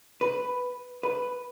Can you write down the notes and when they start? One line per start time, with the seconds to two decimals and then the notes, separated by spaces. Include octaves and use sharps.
0.21 B4
1.03 B4